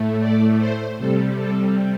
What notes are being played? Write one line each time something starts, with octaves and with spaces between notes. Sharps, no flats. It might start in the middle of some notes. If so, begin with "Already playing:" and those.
Already playing: A2 A3
D5
C5
C3 G3 A4
A4